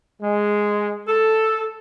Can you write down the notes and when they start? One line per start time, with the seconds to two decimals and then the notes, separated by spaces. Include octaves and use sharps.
0.22 G#3
1.08 A4